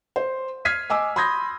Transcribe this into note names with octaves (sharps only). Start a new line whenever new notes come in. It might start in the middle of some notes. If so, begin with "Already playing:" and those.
C5
F6 G#6 B6 C7 D#7
D#5 G#5 D6 E6
B5 C6 D#6 G6 G#6 A#6